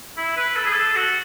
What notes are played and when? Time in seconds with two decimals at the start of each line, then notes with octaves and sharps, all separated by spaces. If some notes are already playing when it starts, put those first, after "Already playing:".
0.17 E4
0.37 B4
0.56 A4
0.65 G#4
0.73 A4
0.96 F#4